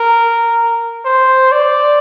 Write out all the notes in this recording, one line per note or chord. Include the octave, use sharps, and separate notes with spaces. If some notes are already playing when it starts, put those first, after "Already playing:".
Already playing: A#4
C5
D5